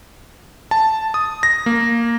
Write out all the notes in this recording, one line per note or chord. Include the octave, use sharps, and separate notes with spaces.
A5
D#6
A#6
A#3